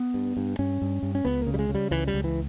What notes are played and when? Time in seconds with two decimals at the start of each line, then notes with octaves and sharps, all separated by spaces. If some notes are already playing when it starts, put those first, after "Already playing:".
Already playing: B3
0.14 G2
0.37 G2
0.59 G2 C#4
0.82 G2
1.03 G2
1.15 C#4
1.25 C#2 B3
1.42 A#3
1.47 C#3
1.54 G3
1.59 G#3
1.69 C#3
1.75 G3
1.91 C#2 E3
2.07 G3
2.14 C#2
2.24 E3